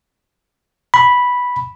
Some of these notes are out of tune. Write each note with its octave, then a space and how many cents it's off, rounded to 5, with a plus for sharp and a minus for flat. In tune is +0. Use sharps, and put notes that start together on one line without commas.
B5 -5